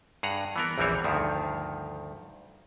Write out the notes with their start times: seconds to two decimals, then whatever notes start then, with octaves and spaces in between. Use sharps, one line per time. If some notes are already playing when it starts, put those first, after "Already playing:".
0.23 G2 G#4 F#5 A#5
0.56 E3 B3 A#4
0.78 A#1 E2 E3 G3 C4 C#5
1.04 D2 G2 D#3 F3